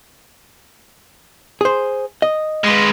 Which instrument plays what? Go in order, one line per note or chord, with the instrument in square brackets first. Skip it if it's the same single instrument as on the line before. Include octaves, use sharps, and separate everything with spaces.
[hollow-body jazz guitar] G#4 C5
D#5
[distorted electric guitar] G#3 B4